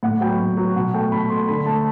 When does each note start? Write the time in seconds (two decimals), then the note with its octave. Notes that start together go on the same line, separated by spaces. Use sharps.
0.03 A2 F#5
0.21 F#3 B3 G5
0.40 A2
0.57 F#3 B3
0.76 B2 F#5
0.94 A3 G5
1.12 B2 B5
1.30 A3 C6
1.48 D3 B5
1.66 A3 A5